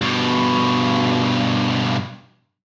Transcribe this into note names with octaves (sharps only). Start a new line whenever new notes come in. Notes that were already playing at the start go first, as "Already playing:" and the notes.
G2 B2